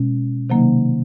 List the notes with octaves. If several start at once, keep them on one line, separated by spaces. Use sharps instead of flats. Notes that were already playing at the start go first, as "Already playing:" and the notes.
Already playing: B2 G#3 C#4
C3 D#3 F#3 A#3 D#4